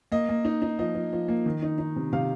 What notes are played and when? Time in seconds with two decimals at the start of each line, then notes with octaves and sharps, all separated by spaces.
0.12 A#3 D#5
0.29 A#3
0.45 D#4
0.62 D#4
0.79 F3 D#5
0.95 F3
1.13 F3
1.28 A#3
1.46 D#3
1.62 D#4
1.78 D#4
1.96 C3
2.13 C3 F5